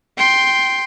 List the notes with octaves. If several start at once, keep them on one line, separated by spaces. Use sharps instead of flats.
G5 C6